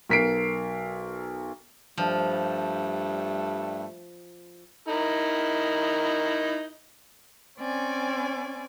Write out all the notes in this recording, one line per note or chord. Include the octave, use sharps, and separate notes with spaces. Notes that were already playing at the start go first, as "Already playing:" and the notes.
B1 A#4 B6 C7 D7
G2 F3 G3 A3
D#4 E4 A#4
C4 C#4 D5 G#5